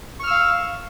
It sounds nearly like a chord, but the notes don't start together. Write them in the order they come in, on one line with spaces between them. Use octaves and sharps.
C#6 F6 E6 F5